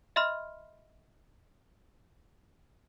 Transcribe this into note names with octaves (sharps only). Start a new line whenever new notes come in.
D#5 E5 B5 C6 F6